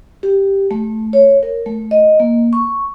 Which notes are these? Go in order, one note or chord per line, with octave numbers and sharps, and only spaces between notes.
G4
A3
C#5
A#4
A3
D#5
A#3
C#6